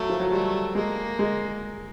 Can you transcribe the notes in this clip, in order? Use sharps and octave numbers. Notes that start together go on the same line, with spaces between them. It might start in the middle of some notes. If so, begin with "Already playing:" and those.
Already playing: F#3 A3
F3
F#3
G3 A3
G#3 A#3
G#3